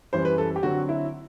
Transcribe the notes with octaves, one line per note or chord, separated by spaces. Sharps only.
F#2 E3 G3 C5
B4
A4
G4
D3 F#3 C4 F#4
E4